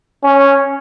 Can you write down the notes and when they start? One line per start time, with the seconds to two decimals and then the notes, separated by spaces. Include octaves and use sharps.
0.23 C#4